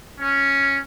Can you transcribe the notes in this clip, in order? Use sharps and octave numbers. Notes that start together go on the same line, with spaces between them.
C#4